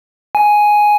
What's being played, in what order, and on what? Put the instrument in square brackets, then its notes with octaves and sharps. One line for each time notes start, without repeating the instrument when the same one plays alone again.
[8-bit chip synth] G#5